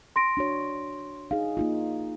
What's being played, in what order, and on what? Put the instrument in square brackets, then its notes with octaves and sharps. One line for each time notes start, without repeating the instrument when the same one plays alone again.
[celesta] C6 A#6 D7
[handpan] D4 F#4 C#5
[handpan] D#4 G#4 [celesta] F5
[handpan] A#3 D#4 F4